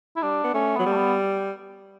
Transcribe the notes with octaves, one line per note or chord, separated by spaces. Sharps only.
E4
G3 D4
B3
A3 C#4
F#3 B3
G3
A3
B3